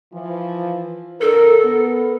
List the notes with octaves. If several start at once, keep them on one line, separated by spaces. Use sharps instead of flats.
E3 F3
D3 D4 A4 A#4
B3